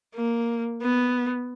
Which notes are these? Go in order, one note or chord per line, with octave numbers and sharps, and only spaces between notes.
A#3
B3